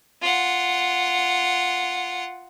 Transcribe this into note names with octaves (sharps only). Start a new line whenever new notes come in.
F4 F#5